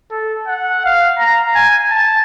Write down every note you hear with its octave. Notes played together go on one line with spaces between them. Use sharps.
A4
F#5
F5
A#5
G#5
A5